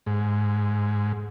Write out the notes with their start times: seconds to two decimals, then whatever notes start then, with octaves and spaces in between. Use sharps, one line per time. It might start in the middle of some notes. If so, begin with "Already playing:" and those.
0.06 G#2